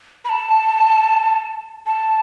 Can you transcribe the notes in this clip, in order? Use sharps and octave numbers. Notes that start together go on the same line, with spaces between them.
B5
A5
A5